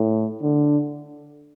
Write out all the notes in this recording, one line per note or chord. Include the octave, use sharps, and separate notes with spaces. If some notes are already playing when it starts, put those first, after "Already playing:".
Already playing: A2
D3